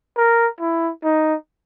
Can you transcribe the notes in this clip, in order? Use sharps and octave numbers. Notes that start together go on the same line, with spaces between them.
A#4
E4
D#4